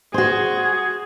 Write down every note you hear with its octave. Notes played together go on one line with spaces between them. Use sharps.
F#4 G#4 C5